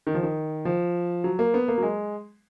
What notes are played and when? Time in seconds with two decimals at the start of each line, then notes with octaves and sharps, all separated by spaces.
0.07 D#3
0.15 F3
0.23 D#3
0.65 F3
1.24 F#3
1.39 A#3
1.54 B3
1.68 A#3
1.78 F#3
1.83 G#3